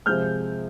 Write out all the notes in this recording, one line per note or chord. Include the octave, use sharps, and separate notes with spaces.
C3 F3 G#3 F6 G6